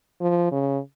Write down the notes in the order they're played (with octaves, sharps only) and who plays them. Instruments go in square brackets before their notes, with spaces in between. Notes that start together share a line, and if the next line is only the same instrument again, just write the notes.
[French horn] F3
C#3